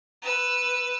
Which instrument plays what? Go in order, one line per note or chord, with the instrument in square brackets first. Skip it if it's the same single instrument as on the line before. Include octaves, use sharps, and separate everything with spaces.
[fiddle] B4 E6